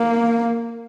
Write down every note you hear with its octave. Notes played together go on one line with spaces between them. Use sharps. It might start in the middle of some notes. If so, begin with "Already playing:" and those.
Already playing: A#3